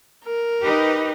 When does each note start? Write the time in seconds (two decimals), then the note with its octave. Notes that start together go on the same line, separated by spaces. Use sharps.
0.25 A#4
0.63 D#4 G4 B4